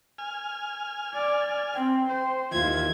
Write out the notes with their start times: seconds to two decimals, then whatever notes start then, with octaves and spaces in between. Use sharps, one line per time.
0.18 G#5 F6
1.14 D5
1.74 C4 G5
2.09 C5
2.52 D#2 E3 F4 G#6